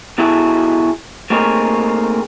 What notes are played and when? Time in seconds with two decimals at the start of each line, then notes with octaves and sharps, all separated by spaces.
0.18 B2 F#3 E4 F#4 G#4 A4
1.30 A3 A#3 C4 D#4 G#4 C#5